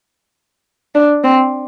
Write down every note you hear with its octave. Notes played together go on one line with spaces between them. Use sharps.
D4
C4